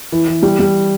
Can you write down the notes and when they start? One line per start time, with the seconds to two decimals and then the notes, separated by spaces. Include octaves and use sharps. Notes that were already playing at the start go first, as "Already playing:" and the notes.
0.12 E3
0.28 E3
0.43 G3
0.59 G3